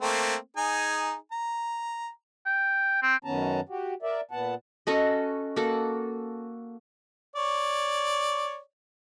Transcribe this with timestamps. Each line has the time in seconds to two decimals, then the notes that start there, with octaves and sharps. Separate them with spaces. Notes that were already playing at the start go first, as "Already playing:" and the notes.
0.01 A3 A#3 C4
0.57 D#4 G#4 G#5
1.32 A#5
2.46 G5
3.02 C4
3.25 F#2 D#3 B3 C#4 A5 A#5
3.69 F#4 G4
4.02 A#4 D5 E5
4.31 A#2 B3 F#5 A5
4.87 C#4 F#4 A4 D#5
5.56 A#3 F#4 A4
7.36 C#5 D5